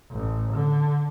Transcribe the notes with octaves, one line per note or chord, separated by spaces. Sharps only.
A1
D3